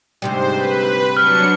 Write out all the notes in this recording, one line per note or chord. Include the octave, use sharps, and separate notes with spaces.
D2 G#2 C3 G3 C5
B4
F#3 D4 F6 C#7